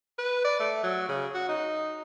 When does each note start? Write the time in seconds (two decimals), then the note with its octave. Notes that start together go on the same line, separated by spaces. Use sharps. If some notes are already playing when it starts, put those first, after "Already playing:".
0.19 B4
0.45 D5
0.60 A3
0.84 F#3
1.09 C#3
1.35 F#4
1.49 D#4